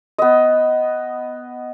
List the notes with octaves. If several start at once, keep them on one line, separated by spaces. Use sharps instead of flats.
B3 D#5